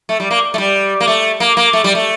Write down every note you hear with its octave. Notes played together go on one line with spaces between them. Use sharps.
A3
G3
A#3
A3
G3
A#3
A3
A#3
A#3
A3
G3
A3